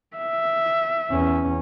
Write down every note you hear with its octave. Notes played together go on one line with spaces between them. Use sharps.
E5
E2 C#4